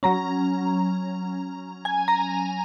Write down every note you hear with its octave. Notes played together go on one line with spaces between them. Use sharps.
F#3 C#4 A#5
G#5
A#5